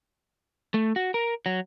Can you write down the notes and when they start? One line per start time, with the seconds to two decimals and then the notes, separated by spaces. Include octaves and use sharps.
0.74 A3
0.96 F#4
1.14 A#4
1.46 F#3